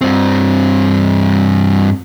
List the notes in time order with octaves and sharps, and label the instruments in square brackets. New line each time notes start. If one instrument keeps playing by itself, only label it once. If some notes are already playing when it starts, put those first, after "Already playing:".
[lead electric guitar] G2 C4